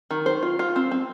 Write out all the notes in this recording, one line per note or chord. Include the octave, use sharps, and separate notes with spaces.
D#3
C5
F4
F4
C4
C4